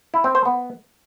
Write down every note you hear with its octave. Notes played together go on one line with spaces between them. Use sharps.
E4
C4
C5
B3